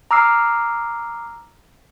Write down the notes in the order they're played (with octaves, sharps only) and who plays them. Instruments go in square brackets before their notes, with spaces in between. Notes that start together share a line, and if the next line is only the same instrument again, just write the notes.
[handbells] A#5 D6 E6 F6 C7